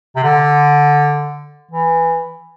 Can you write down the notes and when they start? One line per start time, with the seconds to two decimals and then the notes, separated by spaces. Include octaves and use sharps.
0.16 C3
0.24 D3
1.71 E3